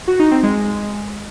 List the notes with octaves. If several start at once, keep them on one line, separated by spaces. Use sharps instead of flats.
F#4
D#4
C4
G#3